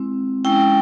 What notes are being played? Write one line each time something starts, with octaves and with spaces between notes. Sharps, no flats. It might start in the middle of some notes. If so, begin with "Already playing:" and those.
Already playing: G#3 C4 E4
G#3 C#4 E4 G5